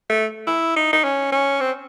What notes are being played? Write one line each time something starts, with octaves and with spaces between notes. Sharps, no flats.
A3
E4
D#4
D#4
C#4
C#4
C4